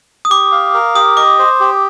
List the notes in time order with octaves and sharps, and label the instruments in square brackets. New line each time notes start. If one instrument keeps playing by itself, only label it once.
[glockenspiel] D#6
[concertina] G4 [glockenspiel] D6
[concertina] F5
A#4
[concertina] G4 [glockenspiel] D#6
[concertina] D#5 [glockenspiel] D6
[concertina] C5
G4